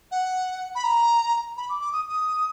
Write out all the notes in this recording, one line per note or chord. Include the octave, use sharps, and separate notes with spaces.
F#5
B5
A#5
B5
D6
D6
D#6
D#6